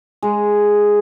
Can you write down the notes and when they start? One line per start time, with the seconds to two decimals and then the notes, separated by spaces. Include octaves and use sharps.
0.22 G#3